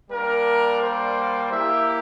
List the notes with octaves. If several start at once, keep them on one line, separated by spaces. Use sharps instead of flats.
G3 A#3 D4 A#4
C5
A#3 E4 G4 E5